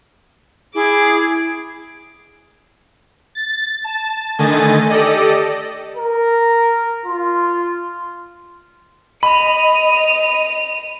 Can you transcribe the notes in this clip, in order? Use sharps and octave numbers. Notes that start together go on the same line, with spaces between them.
E4 G#4 D6
A6
A5
D3 D#3 A3 D#5 G#5 A6
G4 A4 D5 D#5
A#4
F4
D#5 B5 D#7 F7